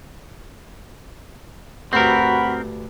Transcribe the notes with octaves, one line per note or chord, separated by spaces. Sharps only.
D2 G2 C4 F#4 A#4 B5